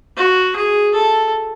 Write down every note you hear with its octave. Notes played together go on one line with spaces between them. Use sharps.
F#4
G#4
A4